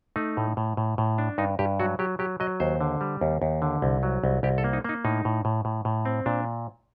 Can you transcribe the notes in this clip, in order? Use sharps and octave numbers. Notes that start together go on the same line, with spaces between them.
A3 D#4
A2
A2
A2
A2
D4
G2 D#4
G2 G4
F#3 F#4
F#3 G4
F#3 G4
F#3 D#5
D#2 C5
D3
G3
D#2
D#2
D3
C2
F#3
C2
C2 G4
A4
A#3
D#4
A#3 D#4
A2 D#4
A2
A2
A2
A2
C4
A#2 D4